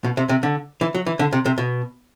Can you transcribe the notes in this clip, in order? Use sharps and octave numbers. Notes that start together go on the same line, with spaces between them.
B2
C3
C3
D3
E3
F#3
E3
D3
C3
C3
B2